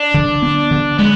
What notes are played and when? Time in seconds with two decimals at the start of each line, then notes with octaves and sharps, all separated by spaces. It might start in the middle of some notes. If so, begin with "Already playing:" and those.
Already playing: D4
0.14 D3
0.42 B3
0.71 D3
0.99 G#3 B3